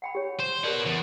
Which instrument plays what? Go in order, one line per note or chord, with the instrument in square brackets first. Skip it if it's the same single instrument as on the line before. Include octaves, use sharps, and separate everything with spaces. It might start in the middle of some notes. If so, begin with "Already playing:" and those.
[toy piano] F#5 G5 B5
G4 C#5
[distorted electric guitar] C5
[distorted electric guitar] F#4 B4 [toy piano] G4 A#4 D5
[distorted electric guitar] E2